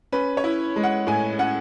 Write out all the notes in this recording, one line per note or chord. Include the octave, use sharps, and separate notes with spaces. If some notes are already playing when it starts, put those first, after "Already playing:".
C#4 B4
C#5
E4
G#3
F#5
A2 G#5
C#4 F#5